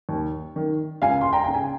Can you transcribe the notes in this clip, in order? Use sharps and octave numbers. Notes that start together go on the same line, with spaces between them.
D#2
D#3
C#2 F5 G#5
C6
G5 A#5
C#3 G5
G#5